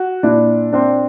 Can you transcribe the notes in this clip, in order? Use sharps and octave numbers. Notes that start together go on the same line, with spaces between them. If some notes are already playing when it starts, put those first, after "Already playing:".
Already playing: F#4
A#2 D4 E4
C4 D4